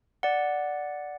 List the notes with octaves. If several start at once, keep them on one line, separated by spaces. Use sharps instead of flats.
D5 F#5